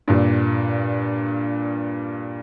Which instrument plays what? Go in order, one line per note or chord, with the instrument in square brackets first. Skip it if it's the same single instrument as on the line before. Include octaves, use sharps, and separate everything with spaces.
[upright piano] G2 A#2